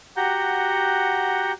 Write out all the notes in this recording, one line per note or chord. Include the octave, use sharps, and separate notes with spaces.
F#4 G4 F#5 A#5 G6